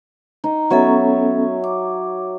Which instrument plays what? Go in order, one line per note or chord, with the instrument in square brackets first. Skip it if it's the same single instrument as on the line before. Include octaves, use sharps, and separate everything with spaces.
[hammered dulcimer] D#4
[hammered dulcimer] F#3 C#5 E5 [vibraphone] B3 C#4 A4
[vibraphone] D6